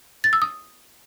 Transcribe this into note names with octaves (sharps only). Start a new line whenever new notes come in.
A6
E6
D#6